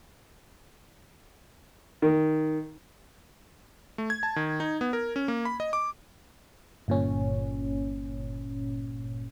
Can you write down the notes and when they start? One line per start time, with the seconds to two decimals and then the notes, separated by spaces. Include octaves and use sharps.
2.02 D#3
3.98 A3
4.10 G#6
4.23 A5
4.36 D#3
4.60 D#4
4.81 B3
4.93 A#4
5.16 C#4
5.28 A#3
5.45 B5
5.60 D#5
5.73 D6
6.88 G1 A#2 C#4